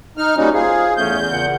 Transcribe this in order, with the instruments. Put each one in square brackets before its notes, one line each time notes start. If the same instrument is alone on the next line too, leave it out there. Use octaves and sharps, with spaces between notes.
[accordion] D#4 F6
[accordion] A#2 G3 D#4 [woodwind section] C#4 F#4
[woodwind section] F4 C5 F5 [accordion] G#4
[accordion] E2 G6 [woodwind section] A3 C#4
[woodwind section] A#2 C#3 F#5